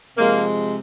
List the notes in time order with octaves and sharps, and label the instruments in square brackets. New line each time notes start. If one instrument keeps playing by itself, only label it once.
[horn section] C3 F3 G#3 A#3